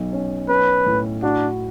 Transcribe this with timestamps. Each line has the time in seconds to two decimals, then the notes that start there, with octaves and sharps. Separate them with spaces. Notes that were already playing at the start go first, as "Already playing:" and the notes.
Already playing: B1
0.13 C#4
0.49 C#4 B4
0.86 A2
1.22 D4 F#4